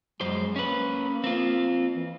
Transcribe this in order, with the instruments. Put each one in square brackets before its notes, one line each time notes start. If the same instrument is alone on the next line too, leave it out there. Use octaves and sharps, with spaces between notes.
[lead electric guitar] F#2 C5 [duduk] G#3
[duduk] A#3 [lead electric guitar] C#4 B4
[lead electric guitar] C4 F4
[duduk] E3